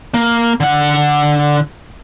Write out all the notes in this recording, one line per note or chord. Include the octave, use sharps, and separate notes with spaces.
A#3
D3 F#5